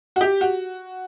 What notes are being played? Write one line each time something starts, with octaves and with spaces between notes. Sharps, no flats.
F#4
G4
F#4